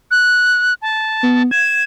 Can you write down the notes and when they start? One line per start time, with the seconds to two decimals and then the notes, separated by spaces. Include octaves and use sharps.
0.11 F#6
0.82 A5
1.23 B3
1.51 G#6 E7